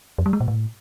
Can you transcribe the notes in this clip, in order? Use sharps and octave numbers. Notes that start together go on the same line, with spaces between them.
F2
G3
G#3
A#2
A2